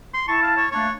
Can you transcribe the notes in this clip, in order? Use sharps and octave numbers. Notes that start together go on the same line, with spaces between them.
C6
E4 A5 C#6
F5
C#5
A3 A#3 D4 C#5